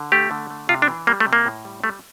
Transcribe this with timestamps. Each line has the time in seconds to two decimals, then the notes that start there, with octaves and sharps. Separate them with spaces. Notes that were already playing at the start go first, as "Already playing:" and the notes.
Already playing: D3
0.12 A3 G4
0.31 D3
0.50 A3
0.69 C3 F4
0.82 D4
0.88 E3
1.07 G3 A#3
1.20 A3
1.27 C3
1.33 A#3
1.46 A2
1.65 G3
1.84 G3 A3